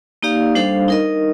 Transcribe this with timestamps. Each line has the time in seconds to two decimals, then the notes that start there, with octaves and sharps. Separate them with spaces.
0.23 A#3 D#4 G4 D5 F5
0.55 G3 D4 A4 C5 F5
0.88 D#4 A#4 D#5